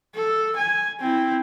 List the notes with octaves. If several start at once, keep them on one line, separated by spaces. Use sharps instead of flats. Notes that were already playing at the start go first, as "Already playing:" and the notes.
A4
G#5
C4 E4